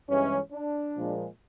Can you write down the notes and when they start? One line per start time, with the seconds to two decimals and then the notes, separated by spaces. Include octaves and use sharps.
0.08 G2 E3 G#3 C#4
0.53 D4
0.96 A#2 F3 G#3